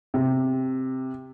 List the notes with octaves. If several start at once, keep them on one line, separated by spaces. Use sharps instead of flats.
C3